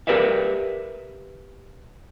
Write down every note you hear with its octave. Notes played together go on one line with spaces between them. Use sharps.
G4 A#4 B4 D5 E5 F5